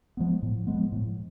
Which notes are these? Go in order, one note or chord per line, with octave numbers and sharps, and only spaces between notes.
F3 G#3 B3
A2
F3 G#3 B3
A2